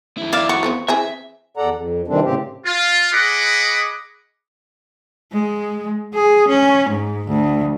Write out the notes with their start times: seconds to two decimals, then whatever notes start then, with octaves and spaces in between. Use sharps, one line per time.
0.18 F2 E4
0.32 D5 E5 F5
0.49 F#4 C#6
0.63 F3 B3 C4
0.88 E3 C4 G#4 E5
1.57 E2 A4 D5 F#5 A#5
1.74 F2
2.08 C3 D#3 E3 G3 C4 D4
2.24 A2 C#3 C4 G4
2.66 F4
3.12 G#4 D#5 F#5 B5 D6
5.32 G#3
6.14 G#4
6.48 C#4
6.89 G#2
7.28 D2